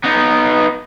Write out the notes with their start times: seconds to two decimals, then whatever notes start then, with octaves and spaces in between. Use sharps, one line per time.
0.04 B3 D#4